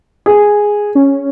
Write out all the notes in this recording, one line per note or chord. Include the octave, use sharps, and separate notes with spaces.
G#4
C#4